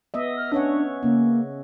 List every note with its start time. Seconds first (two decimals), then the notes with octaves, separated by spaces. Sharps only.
0.14 B3 D#5 E5
0.37 F6
0.52 C#4 D4 C#5 F#5
1.03 C#3 A#3 C#4